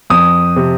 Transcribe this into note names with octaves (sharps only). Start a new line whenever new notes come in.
F2 D#6
C3